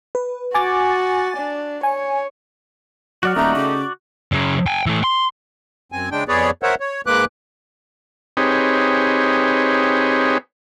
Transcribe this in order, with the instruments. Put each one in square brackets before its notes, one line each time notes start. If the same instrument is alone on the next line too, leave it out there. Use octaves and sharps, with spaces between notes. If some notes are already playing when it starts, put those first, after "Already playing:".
[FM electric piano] B4
[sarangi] F#4 [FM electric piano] G#5 D6 A6
[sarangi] D4
[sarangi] C#5 [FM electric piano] G#5
[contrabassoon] F#3 [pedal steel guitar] F#4 D5 F6 [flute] F#5
[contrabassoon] D#1 [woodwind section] A3 D#4 G4 [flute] A#5
[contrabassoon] C#3 [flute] D6
[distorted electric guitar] F#2 C#3
G5 G#5
E3 A3
C6
[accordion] F#2 C4 G#5
C#3 G#3 D4 G5
F2 B3 G#4 B4 C#5 D5
A#4 C5 C#5 E5 F#5
C#5
G#2 G#3 A#3 B4 D6 F#6
[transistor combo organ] C4 D#4 G4 G#4 B4 C#5